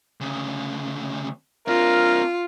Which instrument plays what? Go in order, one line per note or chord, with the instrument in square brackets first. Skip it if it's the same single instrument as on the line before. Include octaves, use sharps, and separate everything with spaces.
[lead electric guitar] D2 C#3
[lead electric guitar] C4 D4 [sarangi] F4 [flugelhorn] A#4